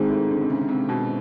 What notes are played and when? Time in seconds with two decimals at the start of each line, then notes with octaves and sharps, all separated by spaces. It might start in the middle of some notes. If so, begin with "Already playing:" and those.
Already playing: G#2 D#3 G#3 C4
0.09 A2
0.30 D3
0.41 C3
0.50 C#3
0.69 C3
0.89 B2